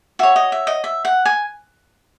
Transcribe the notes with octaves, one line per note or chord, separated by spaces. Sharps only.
F#4 C#5 E5
D#5
E5
D#5
E5
F#5
G#5